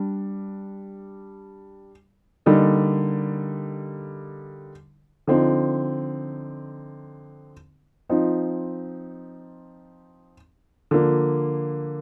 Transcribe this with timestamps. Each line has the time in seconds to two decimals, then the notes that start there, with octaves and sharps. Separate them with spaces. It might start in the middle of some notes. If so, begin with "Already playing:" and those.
Already playing: G3 D4
2.46 D3 G3 A#3 D#4
5.27 D3 F3 C4 D#4
8.10 F3 C4 D#4
10.91 D3 F3 A#3